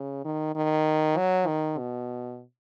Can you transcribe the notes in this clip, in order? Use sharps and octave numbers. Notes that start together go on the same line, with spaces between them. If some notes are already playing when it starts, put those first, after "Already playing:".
Already playing: C#3
D#3
D#3
F#3
D#3
B2